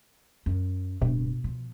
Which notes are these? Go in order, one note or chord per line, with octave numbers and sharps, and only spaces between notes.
F#2
D1 G2 B2
F3